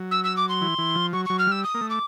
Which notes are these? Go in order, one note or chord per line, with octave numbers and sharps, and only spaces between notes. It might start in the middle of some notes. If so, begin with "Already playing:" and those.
Already playing: F#3
E6
E6
D6
C6
E3
E3
F3
F#3 C#6
F#3 C#6
F6
G3 E6
D#6
A#3
A3
D6